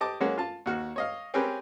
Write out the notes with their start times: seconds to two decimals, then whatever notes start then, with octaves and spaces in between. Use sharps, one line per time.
0.01 G4 D#5 A5 D6
0.20 F#3 G#3 A#3 C#4 F#4
0.38 F4 A5
0.66 D#2 F#4 F6
0.96 C#5 D#5 F5
1.34 C4 C#4 G4 G#4 A#4 B4